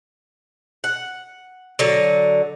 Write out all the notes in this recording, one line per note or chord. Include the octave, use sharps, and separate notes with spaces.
F#5
D3 F#3